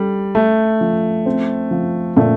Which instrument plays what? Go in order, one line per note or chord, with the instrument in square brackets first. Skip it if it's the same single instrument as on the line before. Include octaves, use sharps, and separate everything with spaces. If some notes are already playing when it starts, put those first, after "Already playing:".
Already playing: [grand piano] G3 [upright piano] A4
[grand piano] A3 [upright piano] A4
[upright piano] F3
C4
F3
[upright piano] A#2 [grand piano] A3